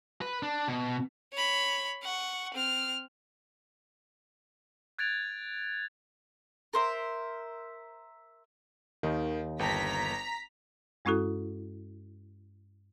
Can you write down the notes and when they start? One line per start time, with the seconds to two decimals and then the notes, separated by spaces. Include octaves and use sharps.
0.21 B4
0.43 D4
0.68 B2
1.33 C#5 B5
2.03 F#5 C#6
2.54 C4 F6
4.99 F#6 G#6 A6 D7 F7
6.73 A#4 C5 E5
9.03 D#2 D#3 D#4
9.59 G1 G5 A5 A#5 B6
11.05 G2 G#3 C#4 E4 F#4 A4